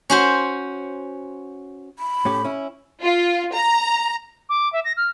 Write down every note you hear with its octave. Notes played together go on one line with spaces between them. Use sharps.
C#4 F#4 C5
B5
A2 C#4 G4
C#4 E4
F4
A#5
D6
E5
A#6
F6